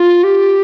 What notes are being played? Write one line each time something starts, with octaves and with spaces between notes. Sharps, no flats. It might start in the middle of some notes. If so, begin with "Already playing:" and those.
Already playing: F4
G4